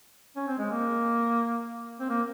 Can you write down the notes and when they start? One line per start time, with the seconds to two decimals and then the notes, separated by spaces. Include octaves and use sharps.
0.36 C#4
0.48 C4
0.59 G#3
0.70 A#3
2.00 C4
2.09 A#3